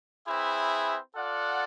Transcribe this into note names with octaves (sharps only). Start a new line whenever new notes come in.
C4 E4 G#4 B4 E5
F4 A4 D5 F#5